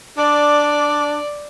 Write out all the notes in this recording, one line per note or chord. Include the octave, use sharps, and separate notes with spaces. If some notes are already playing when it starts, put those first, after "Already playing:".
D4 D5